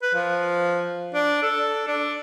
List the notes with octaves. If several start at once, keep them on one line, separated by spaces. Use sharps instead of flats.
B4
F3
D4
A4
D4